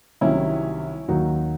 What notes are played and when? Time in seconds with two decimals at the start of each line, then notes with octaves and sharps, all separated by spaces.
0.21 C2 C3 D#3 F#3 C#4 E4
1.08 D#2 D#3 F#3 D#4 F#4